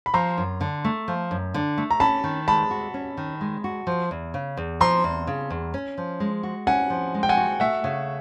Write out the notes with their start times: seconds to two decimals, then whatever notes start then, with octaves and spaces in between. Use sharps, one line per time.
0.06 B5
0.14 F3 A#5 C6
0.38 F#2
0.61 D3
0.85 A3
1.08 F3
1.31 F#2
1.54 D3
1.78 A3
1.91 A#5
2.00 C#4 A5 B5
2.24 D#3
2.48 G#3 A5 B5
2.71 F#4
2.94 C#4
3.17 D#3
3.41 G#3
3.64 F#4
3.87 F3
4.11 E2
4.34 C#3
4.57 E2
4.81 F3 A#5 C6
5.04 E2
5.27 C#3
5.50 E2
5.74 C#4
5.98 F3
6.20 G#3
6.43 F#4
6.67 C#4 F#5 G#5
6.90 F3
7.14 G#3
7.23 G5
7.29 F#5 G#5
7.37 F#4
7.60 A3 E5 F#5
7.84 C#3